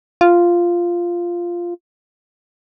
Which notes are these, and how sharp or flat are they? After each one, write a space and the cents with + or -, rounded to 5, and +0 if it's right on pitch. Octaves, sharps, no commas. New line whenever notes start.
F4 -5